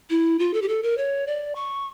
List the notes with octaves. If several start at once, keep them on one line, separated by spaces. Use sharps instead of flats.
E4
F4
A4
G4
A4
A#4
C#5
D5
C#6